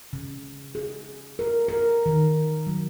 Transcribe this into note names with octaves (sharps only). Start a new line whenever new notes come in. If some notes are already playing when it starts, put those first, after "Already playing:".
C#3
G#4
A#4
A#4
D#3
F#3